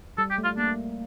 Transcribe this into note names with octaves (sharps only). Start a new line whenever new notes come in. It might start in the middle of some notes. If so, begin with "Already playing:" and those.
G3 A4
G4
A3
F4
A#3 D4